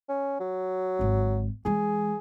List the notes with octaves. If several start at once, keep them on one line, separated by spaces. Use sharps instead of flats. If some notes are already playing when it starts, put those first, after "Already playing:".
C#4
F#3
G#1 D3
E3 G#3 G#4